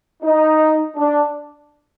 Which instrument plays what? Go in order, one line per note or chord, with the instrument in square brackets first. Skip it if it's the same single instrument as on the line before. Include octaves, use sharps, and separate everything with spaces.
[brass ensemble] D#4
D4